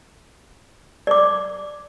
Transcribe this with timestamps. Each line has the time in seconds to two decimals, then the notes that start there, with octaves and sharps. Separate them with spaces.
1.07 D5 D6